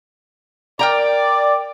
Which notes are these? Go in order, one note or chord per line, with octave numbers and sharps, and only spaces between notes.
A#4 D5 G5 A#5